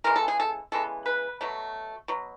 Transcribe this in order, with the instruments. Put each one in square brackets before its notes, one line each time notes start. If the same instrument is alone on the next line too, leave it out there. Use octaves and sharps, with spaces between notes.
[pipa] C#3 E3 G#3 B3 A#4
A4
G#4
A4
C#3 E3 G#3 B3 A4
B4
B2 F#3 A3
B2 F#3